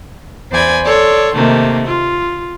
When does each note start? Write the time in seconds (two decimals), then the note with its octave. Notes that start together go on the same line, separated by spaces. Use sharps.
0.50 E2 C5 D5 G#5 B5
0.84 A4 C#5 D5 C6
1.34 C3 D#3 A3 A#3
1.85 F4